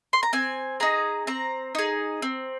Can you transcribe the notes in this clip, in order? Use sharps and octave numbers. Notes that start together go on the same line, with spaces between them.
C6
A#5
C4 G#5
D#4 G#4 A#5
C4 A#5
D#4 G#4
C4